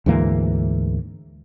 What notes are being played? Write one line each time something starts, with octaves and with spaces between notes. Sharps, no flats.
D2 G#2 E3 A#3